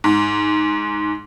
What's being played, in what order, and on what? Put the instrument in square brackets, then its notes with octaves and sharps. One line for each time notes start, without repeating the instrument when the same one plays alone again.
[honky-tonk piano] G#2